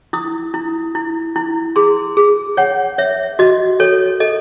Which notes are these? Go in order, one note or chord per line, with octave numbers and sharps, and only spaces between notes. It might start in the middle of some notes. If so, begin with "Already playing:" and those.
E4 D#6
E4
E4
E4
G#4 C6
G#4
C#5 F#5
C#5 E5
F#4 D#5
A4 C#5
A4 D#5